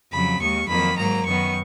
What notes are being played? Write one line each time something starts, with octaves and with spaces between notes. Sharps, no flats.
F2 C#3 F#3 B5
D#2 D#3 G#3 C#6
F2 D#3 F#3 A#3 B5
G#2 F#3 A#3 A#5
F#2 D#3 F#3 B3 C#6